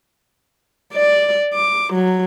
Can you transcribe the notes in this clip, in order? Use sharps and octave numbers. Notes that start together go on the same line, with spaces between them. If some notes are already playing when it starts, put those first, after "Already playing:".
D5
D6
F#3